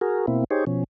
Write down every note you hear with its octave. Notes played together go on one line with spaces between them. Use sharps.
F#4 G#4 A#4
B2 A#3 C4 E4
D#4 G4 G#4 C5 C#5
B2 F3 C#4